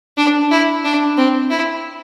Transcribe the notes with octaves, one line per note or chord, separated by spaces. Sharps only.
D4
E4
D4
C4
E4